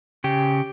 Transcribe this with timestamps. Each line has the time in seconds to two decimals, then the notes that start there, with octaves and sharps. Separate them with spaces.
0.24 C#3 G4